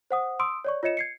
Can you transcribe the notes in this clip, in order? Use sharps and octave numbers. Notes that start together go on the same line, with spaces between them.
C5 F#5 D#6
C6 D#6 E6 D7
C#5 D5 C#6
F4 C#5 D#5 C#7 E7
G#6 C7 C#7